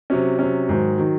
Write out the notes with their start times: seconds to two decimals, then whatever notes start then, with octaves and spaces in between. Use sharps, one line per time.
0.10 C3 F#3 C#4
0.39 C3 F#3 C#4
0.69 G#2 D#3 F#3
0.98 D#3 F#3